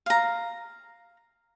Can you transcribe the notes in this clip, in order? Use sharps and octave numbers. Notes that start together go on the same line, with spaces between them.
F5 A#5